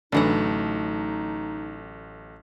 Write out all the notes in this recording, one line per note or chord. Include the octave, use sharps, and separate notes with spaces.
A1 D3 E3 F#3 A3 D#4 F#5